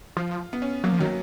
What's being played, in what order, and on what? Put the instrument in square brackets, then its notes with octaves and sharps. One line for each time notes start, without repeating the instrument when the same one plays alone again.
[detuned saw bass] F3 [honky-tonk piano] F4
[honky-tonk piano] B3
C#4
[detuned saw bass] F#3 [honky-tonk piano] A#3
[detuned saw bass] F3
[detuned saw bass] D#3 [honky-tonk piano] F#3